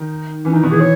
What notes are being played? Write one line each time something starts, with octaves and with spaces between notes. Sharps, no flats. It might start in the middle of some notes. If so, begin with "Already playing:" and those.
Already playing: D#3 D#4
E3 C#4
D#3 D#4
B2 F#4
E3 G#4
C#5